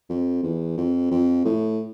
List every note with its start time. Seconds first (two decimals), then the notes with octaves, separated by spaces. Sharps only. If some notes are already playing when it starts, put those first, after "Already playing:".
0.10 F2
0.43 E2
0.77 F2
1.11 F2
1.45 A2